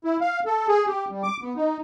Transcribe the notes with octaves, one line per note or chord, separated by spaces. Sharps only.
E4
F5
A4
G#4
G4
G3
D6
B3
D#4